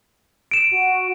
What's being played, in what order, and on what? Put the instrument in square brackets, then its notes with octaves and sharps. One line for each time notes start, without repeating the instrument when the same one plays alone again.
[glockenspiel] D7 E7
[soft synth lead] F#4